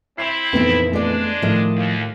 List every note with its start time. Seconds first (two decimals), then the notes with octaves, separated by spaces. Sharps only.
0.18 C4 E4 C7 E7 F7
0.53 F2 A#2 E3 B3 D#4
0.93 G#3 A3 D4 D5
1.42 A2 D#3 F3 A3 D#5
1.75 D#2